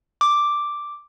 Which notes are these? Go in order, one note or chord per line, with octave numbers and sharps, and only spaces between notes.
D6